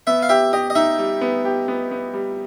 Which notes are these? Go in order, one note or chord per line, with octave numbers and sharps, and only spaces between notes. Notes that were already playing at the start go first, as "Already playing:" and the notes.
B3 E5
F5
G4 E5
G4 D#5
D#5
D#4 E5
G3
B3
G4
B3
B3
G3